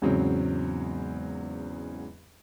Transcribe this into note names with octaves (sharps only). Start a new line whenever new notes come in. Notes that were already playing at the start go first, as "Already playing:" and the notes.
E2 G#2 C#3 F#3 C4